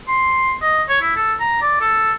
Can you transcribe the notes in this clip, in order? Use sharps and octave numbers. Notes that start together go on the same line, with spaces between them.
C6
D#5
C#5
E4
A4
A#5
D5
A4